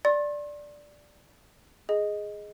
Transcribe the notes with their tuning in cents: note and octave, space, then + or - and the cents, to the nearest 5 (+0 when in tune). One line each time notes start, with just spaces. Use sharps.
D5 +0 C6 +45
G#4 +0 D#5 +0